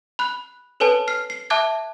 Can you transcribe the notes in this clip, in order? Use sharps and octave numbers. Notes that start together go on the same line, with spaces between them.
B5 F#6
A4 B4 C#5 G#5 A5
F6 C7
C7
E5 A5 D6 F#6 G#6